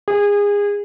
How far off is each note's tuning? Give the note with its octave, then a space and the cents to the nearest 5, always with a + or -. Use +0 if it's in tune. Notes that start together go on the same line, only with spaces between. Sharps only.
G#4 -25